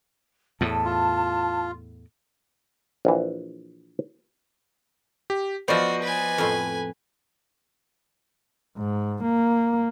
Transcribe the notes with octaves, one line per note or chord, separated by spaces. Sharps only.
E2 A2 A5
F4
A#1 E3
G4
F3 B3 F#4 C5 D5 D#5
B4 G#5
F2 A2 C6
G#2
A#3